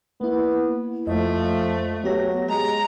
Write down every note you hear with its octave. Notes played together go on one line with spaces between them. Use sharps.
A#3 B3 E4
F2 F3 A3 D#5
F#3 B3 G4 A#6
G#3 A#5